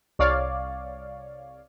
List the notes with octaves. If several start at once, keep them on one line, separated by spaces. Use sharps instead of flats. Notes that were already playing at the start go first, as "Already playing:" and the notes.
C2 C#5 D5 F5